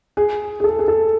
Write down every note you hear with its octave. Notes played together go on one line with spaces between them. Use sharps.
G#4
G#4
A4
G#4
A4